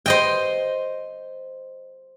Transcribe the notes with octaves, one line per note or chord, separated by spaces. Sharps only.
C5 D#5 G5